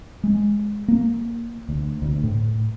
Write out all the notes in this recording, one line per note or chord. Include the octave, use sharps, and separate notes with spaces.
G#3
A#3
D2
D2
A2